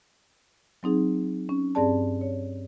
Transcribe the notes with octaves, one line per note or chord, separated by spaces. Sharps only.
F#3 C4 D#4 G#4
C#4
G2 C4 G#4 D5 A5
C#5